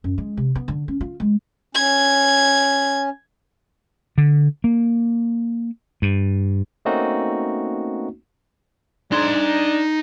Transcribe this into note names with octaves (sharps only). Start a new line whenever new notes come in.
F#2
G#3
C3
B3
D3
C#4
F4
G#3
C#4 G#6
D3
A#3
G2
A3 A#3 C4 C#4 D#4 F#4
D4 D#4 C6